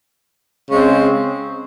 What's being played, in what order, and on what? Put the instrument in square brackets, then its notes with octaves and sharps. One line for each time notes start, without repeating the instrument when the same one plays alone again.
[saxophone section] C#3 G#3 C4